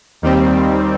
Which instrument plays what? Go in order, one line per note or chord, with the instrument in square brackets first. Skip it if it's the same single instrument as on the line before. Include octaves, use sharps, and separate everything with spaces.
[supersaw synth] D#2 D#3 G3 C4